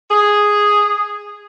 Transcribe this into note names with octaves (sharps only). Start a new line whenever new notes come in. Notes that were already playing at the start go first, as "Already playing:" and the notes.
G#4